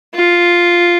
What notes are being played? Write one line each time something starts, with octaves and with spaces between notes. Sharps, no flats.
F4